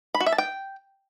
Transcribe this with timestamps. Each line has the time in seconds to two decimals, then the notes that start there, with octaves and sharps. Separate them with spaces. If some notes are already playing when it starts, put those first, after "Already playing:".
0.15 B5
0.20 F#4
0.26 E5
0.32 A5
0.38 G5